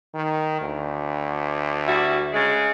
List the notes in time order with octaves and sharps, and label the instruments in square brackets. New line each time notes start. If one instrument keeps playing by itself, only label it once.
[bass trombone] D#3
D2
[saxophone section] G3 E4 F#4
C#3 G#3